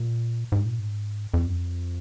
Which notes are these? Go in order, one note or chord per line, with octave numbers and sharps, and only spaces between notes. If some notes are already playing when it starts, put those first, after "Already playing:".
Already playing: A#2
G#2
A#2
G#2
F2
F#2
F2